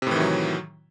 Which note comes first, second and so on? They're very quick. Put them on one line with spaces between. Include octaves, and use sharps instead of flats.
C3 A2 E3 D#3 F#3